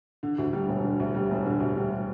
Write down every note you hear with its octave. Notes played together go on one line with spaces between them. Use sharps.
D3
D2
G3
E1
D3
D2
G3
E1
D3
D2
G3